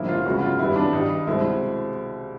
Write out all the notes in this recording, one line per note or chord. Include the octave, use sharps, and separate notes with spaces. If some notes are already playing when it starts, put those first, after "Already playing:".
Already playing: A1 G2 D3 F3 A#3 E4
F4
C#2 C#3 F#3 B3 F#4
F4
F#2 D#3 G3 B3 E4
D4
G2 D#3 G3 D#4
C2 B2 G#3 C4 E4